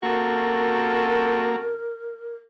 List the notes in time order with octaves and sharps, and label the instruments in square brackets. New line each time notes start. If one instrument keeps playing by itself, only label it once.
[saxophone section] F#2 C3 A4 [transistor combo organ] A#3 [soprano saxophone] F#4 [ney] A#4